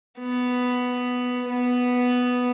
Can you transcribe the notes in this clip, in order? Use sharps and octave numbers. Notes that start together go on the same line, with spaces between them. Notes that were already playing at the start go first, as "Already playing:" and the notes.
B3
B3